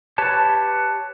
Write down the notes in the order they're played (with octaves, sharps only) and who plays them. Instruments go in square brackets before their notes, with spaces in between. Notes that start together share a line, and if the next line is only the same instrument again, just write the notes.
[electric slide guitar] G4 B4 C#5 A5